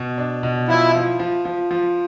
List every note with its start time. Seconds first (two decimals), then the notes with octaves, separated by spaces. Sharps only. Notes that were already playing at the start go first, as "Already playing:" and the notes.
Already playing: B2
0.18 D4
0.43 B2
0.68 F3 E4
0.94 F3
1.19 F3
1.45 F3
1.71 F3